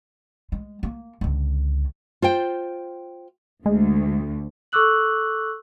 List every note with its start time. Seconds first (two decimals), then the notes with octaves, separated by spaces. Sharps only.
0.52 G#3
0.83 A#3
1.21 C#2 D3
2.22 F4 C5 G5
3.66 D2 G#3
4.72 A4 C#6 D6 E6 F#6 F#7